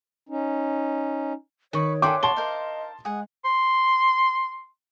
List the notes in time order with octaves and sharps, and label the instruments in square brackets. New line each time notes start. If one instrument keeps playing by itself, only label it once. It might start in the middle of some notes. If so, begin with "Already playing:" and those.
[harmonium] C#4 D#4
[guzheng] D#3 [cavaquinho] B4 C#6 [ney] C#5
[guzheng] D4 E5 F#5 [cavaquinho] G#4 A4 G5 [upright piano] C6 D6
[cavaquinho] F#4 [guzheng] D5 [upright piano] A5 C6 G7
[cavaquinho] A#4 C5 F5 [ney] D#5
[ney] G#3 [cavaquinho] G#4 F#5
[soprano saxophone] C6